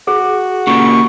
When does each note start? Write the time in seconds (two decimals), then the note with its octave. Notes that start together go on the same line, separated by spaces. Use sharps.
0.07 F#4 G#4
0.67 A#2 C#3 C#6